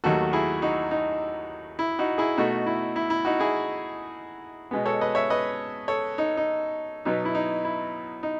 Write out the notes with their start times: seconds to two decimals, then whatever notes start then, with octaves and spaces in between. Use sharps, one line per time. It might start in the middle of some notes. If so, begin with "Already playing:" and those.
0.04 D#2 D#3 F#3 A3 F#4 A4
0.33 E4 G#4
0.62 D#4 F#4
0.91 D#4
1.79 E4
1.99 D#4 F#4
2.18 E4 G#4
2.37 B2 A3 D#4 F#4
2.66 E4
2.96 E4
3.10 E4
3.25 D#4 F#4
3.39 E4 G#4
4.71 B2 G#3 B3
4.86 A4 C#5
5.01 B4 D#5
5.15 C#5 E5
5.30 B4 D#5
5.88 A4 C#5
6.18 D#4
6.37 D#4
7.05 B2 F#3 B3 D#4
7.25 E4
7.35 D#4
7.65 E4
8.23 D#4